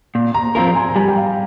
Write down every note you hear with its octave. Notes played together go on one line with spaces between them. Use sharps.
A#2
A#5
F3 C4 F4 A#4 A#5
G#5
A#5
G3 G#5
G5
F5